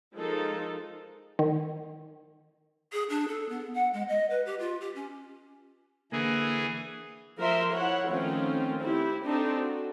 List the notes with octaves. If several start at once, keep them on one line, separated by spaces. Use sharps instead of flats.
F3 G#3 D#4 F4 A4 A#4
D#3
G#4
D4
A4
B3
F#5
G#3
D#5
B4
G4
F4
G4
C#4
D3 E3 A#3 G#4
F3 A#4 E5 C6
E4 C#5 F#5
D#3 F3 A3 C4 C#4 F4
C4 E4 G4
C4 D4 D#4 A4
F#4